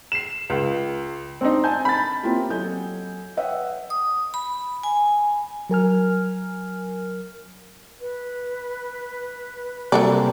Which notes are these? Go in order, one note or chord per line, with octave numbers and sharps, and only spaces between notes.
C7 E7
C#2
C4 D4 D#4
G#5 A5 G6
B5 A6
A#3 C4 C#4 E4 F4 G4
F#3 A4 D#5 G#5 G6
B4 C#5 D#5 E5 F#5 G5
D#6
B5
G#5
F#3 A#4 G#5 F6
B4
C3 F#3 G3 A#3 A4 D5